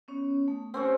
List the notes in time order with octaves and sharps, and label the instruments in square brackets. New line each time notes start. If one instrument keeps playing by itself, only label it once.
[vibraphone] B3 C#4 C#5
A3
[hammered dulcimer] C4 C#4 C#5 [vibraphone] G4